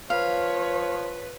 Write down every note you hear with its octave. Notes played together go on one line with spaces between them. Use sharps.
F3 B4 C#5 F5